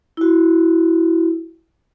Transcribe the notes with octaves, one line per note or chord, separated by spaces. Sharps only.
E4 F#4